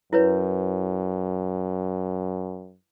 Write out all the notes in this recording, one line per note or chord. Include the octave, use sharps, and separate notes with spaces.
F#2 E4 B4 C#5